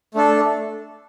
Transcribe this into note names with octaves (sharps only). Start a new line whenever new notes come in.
A3 D4 A4